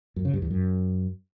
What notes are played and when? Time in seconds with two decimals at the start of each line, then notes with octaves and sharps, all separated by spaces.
0.16 F#2
0.25 C#3
0.33 G2
0.42 E2
0.51 F#2